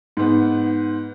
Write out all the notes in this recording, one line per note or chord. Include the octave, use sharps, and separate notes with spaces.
G#2 B3